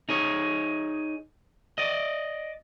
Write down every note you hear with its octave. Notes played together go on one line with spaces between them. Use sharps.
D#4 G#4 C#5
D5 D#5